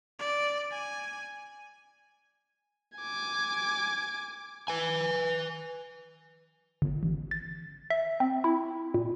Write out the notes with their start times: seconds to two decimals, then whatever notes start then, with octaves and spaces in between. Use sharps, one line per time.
0.19 D5
0.71 G#5
2.98 G#5 D6
4.68 B4 G#5
6.82 G1
7.03 A1
7.31 A6
7.90 E5
8.20 C4
8.44 E4
8.94 A#2